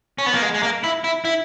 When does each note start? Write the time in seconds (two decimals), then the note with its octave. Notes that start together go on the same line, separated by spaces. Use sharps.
0.18 C#4
0.26 B3
0.34 A#3
0.42 G#3
0.54 G#3
0.63 A#3
0.84 E4
1.04 E4
1.25 E4